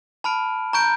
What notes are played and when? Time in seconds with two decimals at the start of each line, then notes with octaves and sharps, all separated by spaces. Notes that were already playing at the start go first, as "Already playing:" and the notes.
0.24 A5 B5 F6 D7
0.73 A#5 C#6 G6 D7